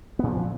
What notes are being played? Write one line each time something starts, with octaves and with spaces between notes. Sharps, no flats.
A#2 F3 B3